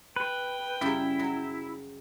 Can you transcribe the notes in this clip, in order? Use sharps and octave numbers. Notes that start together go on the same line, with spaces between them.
B4 G5
F#2 C#3 G3 E4
F#3